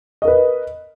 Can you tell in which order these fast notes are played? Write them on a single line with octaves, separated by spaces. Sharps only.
D#5 A#4 B4